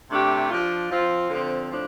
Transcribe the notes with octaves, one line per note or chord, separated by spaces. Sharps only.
C3 A3 D4 G4
F3 D4 F4
F3 C4 F4
D3 F3 C4
A2 F3 D4